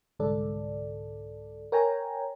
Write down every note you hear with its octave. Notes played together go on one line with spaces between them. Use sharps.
C2 G#2 D3 A4 D5
A#4 C#5 G5 G#5 A#5